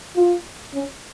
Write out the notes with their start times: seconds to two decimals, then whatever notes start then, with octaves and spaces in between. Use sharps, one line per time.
0.16 F4
0.74 C#4